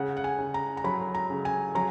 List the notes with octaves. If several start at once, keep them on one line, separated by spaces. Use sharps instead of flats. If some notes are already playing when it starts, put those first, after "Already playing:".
Already playing: C#3 F#5
F#5
G#5
C#3
A#5
A#5
F#3 B5
A#5
C#3
G#5
F#3 A#5